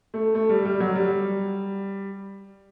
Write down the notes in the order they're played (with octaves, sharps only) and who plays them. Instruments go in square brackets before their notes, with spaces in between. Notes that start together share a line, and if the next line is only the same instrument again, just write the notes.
[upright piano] A3
A3
G3
G3
F#3
G3